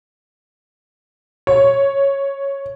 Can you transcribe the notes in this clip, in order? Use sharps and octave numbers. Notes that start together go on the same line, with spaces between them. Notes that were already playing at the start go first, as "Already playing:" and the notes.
C#5